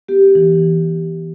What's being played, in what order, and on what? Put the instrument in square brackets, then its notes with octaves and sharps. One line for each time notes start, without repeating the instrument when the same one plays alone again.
[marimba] B3 G4
E3